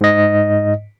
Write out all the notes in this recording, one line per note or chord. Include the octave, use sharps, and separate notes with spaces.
G#2 D#5